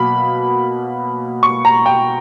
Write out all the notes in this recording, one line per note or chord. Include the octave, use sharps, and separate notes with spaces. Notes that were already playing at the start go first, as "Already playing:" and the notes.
Already playing: B2 F#3 A#3 B5
C#6
A#5
G5